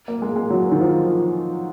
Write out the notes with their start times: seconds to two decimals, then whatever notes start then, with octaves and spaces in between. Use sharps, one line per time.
0.08 A#3
0.22 G#3
0.36 G#3
0.50 F#3
0.72 D#3
0.80 F3